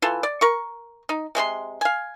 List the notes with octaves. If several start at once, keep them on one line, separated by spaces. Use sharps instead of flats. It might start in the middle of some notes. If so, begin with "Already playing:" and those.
E3 F4 A4
D5
A#4 C#6
D#4
C3 G#3 C#4 C6
F5 G#5